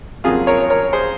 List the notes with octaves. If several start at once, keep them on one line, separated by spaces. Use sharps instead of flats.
F2 C#3 F#3 A#3 F4 G#4
A#4 C#5
A#4 C#5
G#4 C5